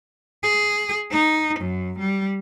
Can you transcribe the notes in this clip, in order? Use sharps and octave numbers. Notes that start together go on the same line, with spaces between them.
G#4
D#4
F#2
G3